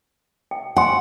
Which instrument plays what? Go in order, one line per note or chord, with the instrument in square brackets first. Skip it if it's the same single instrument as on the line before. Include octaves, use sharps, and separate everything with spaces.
[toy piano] G5
[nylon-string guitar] F#5 [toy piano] G#5 C6